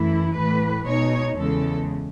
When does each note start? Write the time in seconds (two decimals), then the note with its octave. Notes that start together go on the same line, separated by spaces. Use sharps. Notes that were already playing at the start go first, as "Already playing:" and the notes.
Already playing: F#2 E3 A3 E4
0.35 A2 E3 A3 B4
0.86 B2 G#3 D#4 C#5
1.37 E2 C#3 G#3 A4